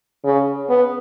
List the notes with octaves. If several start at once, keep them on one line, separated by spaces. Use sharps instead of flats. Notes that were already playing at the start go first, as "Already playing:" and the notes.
C#3
B3